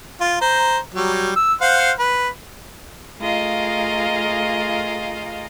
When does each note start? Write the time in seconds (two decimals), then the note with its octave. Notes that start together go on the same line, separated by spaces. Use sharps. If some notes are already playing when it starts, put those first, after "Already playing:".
0.21 F4
0.41 C5 A#5
0.94 F#3 G3
1.36 E6
1.61 C5 F5 F#5
1.99 B4
3.20 A3 F4 G#4 A#4 D#5 F5